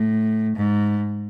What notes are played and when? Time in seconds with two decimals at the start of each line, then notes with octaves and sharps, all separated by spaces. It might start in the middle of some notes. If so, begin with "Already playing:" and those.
Already playing: A2
0.56 G#2